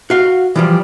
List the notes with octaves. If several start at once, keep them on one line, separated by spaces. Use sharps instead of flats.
F#4 F5
E3 F3 G3